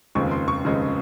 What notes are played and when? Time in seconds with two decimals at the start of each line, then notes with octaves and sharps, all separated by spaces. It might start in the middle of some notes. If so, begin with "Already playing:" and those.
0.15 F1 D#2 C#3 F3 G#3 C#6
0.31 C6
0.48 C#6
0.65 F1 D#2 C#3 F3 G#3